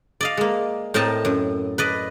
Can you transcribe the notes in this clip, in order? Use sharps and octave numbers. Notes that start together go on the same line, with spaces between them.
D5 D#5 F5
G#3 A#3
A2 C4 A#4 D#5 A5
F#2
B4 D5 D#5